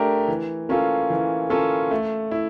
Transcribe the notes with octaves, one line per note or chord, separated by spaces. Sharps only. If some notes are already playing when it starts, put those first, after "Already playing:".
Already playing: A3 D4 G4 A#4
E3
A#3 C#4 F4 A4
E3
A#3 C#4 F4 A4
A3
E4